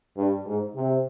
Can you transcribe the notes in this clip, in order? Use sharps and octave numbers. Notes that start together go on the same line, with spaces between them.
G2
G#2
C3